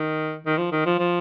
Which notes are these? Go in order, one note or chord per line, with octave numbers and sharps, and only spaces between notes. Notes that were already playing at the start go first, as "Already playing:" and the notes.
Already playing: D#3
D#3
F3
D#3
F3
F3